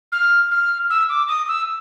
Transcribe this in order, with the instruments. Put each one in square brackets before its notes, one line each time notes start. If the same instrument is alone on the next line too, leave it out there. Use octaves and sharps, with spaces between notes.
[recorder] F6
F6
E6
D6
D#6
E6